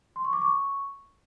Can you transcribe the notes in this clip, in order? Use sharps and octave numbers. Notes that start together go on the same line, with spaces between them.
C6
C#6
D6
C#6